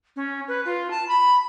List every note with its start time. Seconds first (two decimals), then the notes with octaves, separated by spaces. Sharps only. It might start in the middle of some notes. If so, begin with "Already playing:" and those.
0.16 C#4
0.48 B4
0.65 F4
0.91 A5
1.08 B5